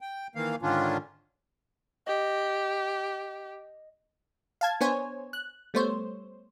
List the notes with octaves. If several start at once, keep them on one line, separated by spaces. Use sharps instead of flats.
G5
D#3 E3 A#3 F5
G#2 D3 D#3 C#4 D4 F4
G4 D#5
F5 A5 G#6
B3 D4 C5 C#5 G#5
F#6
G3 A3 B3 C5 C#5